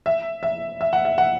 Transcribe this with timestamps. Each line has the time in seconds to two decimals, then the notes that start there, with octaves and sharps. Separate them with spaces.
0.06 E5
0.43 E5
0.81 E5
0.93 F#5
1.05 E5
1.18 F#5